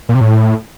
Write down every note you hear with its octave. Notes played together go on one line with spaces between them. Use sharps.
A#2
C3
A2